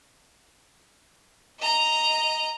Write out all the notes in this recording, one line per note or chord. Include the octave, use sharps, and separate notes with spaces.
D#5 A#5